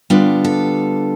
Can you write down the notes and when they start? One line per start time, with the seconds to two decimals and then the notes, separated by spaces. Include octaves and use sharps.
0.10 D3 G3 B3 D4 F4
0.45 A4